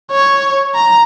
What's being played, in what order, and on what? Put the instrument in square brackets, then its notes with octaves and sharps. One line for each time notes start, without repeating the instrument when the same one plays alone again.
[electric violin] C#5
A#5